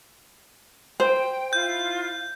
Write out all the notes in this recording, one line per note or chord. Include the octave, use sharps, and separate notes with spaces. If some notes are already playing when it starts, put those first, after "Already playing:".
C5 G5
E4 F4 G6